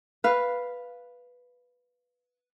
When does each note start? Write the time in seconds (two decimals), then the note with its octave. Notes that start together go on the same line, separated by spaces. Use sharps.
0.24 B4 F5